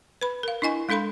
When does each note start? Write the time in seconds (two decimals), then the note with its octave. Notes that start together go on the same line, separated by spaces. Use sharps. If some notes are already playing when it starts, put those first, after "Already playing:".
0.21 B4 B5
0.43 A#4 F5
0.62 D4 E4 D#5 G#5 C#6
0.89 G#3 D4 A4 F5 B5 C6